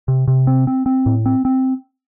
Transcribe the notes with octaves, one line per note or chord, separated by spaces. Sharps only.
C3
C3
C4
C4
C4
A2
C4
C4